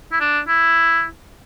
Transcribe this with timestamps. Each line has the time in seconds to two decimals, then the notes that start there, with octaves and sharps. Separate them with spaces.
0.11 E4
0.20 D4
0.47 E4